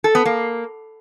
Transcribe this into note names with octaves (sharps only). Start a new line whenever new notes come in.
A4
B3
A#3